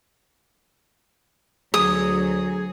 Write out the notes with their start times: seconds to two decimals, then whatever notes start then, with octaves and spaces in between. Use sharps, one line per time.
1.74 D2 F#3 G#4 D#6